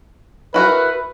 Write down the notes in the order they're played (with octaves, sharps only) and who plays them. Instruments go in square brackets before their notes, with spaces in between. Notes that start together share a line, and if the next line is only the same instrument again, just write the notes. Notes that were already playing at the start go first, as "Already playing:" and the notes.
[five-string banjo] E4 F#4 A#4 [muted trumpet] B4